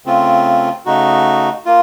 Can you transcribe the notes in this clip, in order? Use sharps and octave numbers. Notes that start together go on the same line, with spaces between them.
C#3 A3 C4 F4
C#3 A3 D#4 F#4
A#3 F4